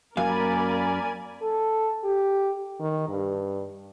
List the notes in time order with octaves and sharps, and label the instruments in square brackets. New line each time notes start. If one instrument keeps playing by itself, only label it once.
[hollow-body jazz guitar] F#2 F5 [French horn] A#3 [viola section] A#4 D5 B5 [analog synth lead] G#5
[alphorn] A4
G4
D#3
G2